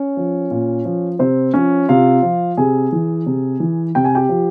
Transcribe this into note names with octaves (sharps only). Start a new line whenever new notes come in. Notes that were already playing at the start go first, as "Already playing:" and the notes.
Already playing: C#4 C#5
F3
A#2
F3
C3 C4 C5
F3 C#4 C#5
C3 F4 F5
F3
C3 G#4 G#5
E3
C3
E3
C3 G5
G#5
G4 G5
F3